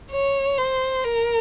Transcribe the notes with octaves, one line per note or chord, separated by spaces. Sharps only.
C#5
C5
A#4